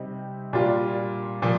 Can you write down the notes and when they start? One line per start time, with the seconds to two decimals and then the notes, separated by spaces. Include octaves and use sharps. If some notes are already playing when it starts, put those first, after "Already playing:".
Already playing: C3 G3 C4 D#4
0.53 A#2 G3 D4 F4
1.42 A#2 F3